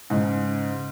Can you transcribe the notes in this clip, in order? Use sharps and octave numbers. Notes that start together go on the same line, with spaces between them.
G#2 C#3